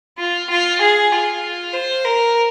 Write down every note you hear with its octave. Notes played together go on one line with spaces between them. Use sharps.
F4
F4
G#4
F4
C5
A#4